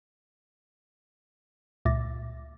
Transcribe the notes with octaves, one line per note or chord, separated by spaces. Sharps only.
C#2 A#2 E5 D6 A6 A#6